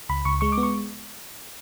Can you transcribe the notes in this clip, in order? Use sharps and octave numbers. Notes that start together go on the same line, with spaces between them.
C#2 B5
C#2 C#6
G#3 C#6
D6
B3
C#6